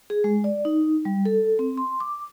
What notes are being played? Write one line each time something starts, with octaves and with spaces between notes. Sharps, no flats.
G#4
G#3
D5
D#4
G3
A4
C4
C6
D6